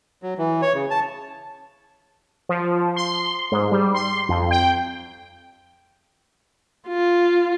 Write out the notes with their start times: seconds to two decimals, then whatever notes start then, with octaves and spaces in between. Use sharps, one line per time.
0.23 F#3
0.38 E3
0.62 C#5
0.74 C#3
0.91 A5
2.49 F3
2.96 C6
3.52 G#2
3.72 G3
3.94 C6
4.29 F2
4.51 G5
6.88 F4